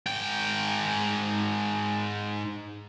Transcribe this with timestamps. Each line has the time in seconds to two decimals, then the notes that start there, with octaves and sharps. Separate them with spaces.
0.06 G#2 G5